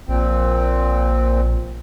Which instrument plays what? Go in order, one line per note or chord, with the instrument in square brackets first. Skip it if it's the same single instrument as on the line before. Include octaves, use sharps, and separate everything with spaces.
[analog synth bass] A#1 [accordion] A#2 C4